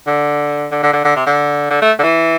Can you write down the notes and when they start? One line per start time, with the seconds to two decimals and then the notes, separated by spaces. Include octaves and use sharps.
0.07 D3
0.71 D3
0.83 D3
0.93 D3
1.05 D3
1.16 C3
1.26 D3
1.70 D3
1.82 A3
1.99 D3
2.03 E3